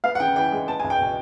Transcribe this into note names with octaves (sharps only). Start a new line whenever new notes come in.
B3 F5
F#5
C#3 G5
E3 G5
G#3
B3 A5
C#2 G#5
G5
B2 G#5